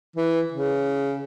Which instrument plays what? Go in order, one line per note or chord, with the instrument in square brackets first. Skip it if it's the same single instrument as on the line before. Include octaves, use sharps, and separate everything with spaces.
[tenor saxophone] E3
C#3